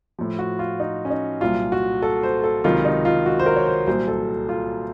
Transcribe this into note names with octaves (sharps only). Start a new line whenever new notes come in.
A2 F3
F#4
F4
D#4
C#4
D#4
C2 A#2 F#3 F4
F#4
A4
C5
A4
C#2 C3 D#3 F#3 F4
D#4
F4
F#4
C5
A#4
C#5
C5
C2 A#2 F#3 C5
A4
F4